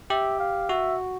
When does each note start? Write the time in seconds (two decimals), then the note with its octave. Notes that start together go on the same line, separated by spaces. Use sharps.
0.10 G4 E5
0.39 F5
0.69 F#4 E5